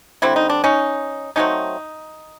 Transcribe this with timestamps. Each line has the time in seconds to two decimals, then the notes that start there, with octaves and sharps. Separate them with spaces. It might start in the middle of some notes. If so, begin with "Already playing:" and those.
0.22 D3 G3 C4 E4
0.36 D#4
0.50 D4
0.64 C#4 D#4
1.36 D3 F#3 A3 C4 C#4 D#4